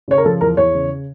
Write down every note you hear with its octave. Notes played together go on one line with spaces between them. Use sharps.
C#3 C#5
A#4
F3 A4
E2 A#4
E2 C#5
C#3